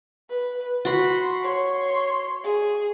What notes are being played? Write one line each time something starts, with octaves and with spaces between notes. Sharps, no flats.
B4
F#4 B5 C6
C#5 C6
G#4